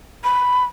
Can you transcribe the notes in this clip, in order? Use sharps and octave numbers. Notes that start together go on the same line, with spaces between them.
B5